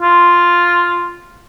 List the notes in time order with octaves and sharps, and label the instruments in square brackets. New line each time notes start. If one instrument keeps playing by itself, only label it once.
[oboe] F4